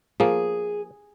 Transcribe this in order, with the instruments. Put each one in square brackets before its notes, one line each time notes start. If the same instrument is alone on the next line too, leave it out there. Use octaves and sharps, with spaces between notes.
[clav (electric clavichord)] F3 A#3 [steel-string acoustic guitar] G#4